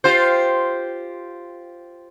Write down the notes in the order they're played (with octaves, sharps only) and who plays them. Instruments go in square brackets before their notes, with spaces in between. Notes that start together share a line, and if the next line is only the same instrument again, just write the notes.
[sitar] F4 G4 C5